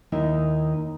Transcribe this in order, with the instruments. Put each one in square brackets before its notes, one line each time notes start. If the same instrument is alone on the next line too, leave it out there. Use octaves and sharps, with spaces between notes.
[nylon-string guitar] D#2 D#4 E4 E5